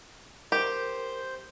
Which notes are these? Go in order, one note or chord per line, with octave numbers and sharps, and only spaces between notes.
G4 A#4 C5 G6